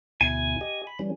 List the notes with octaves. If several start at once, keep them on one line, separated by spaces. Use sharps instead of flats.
D2 B2 E4 G#5
G4 D#5
B5
E3 G3 C#4